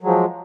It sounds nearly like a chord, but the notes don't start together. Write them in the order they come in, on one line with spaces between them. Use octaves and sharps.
F#3 G#3 F3